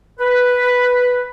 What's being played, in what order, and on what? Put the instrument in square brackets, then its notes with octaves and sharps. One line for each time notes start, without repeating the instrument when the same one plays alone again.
[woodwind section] B4